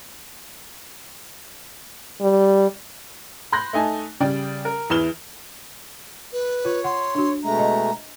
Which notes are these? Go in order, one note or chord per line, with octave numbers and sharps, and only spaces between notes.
G3
B5 C6 F#6 G6 A#6
A3 D#4 G#5 A5
C#3 G3 D5 G5
A#4
E2 E3 B4 F6 E7 G7
B4
F4 C#5
F#5 C6
D4 F#4
B2 G#3 A3 A#5
D#5